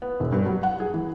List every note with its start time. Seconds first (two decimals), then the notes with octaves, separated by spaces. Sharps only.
0.02 B3
0.20 E1
0.32 G2
0.46 F#3
0.63 F#5
0.80 G#4
0.94 E3